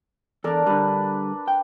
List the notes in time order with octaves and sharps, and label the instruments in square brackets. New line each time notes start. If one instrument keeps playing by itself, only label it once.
[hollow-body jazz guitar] E2 A4 D5 [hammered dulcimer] D4 A#4
[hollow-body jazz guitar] D3 G3 [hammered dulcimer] B4
[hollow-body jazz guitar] G5